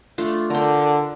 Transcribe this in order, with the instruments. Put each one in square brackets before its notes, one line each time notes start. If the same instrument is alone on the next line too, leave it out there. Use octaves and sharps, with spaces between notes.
[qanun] A3 D4 F4
[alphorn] D3 [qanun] A#4 G5